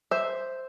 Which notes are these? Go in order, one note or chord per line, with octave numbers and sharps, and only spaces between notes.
C5 E5